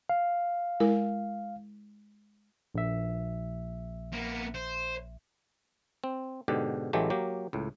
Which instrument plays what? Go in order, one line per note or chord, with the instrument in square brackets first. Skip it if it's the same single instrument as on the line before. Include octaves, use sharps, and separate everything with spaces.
[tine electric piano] F5
[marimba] G#3 E4 A#4
[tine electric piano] A#1 E5
[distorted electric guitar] A#3 B3
C5
[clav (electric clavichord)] C4
G#2 B2 D3 G4
A1 E3 F#3 G#3 A3 G4
F#3 A#3 G4
C#2 A2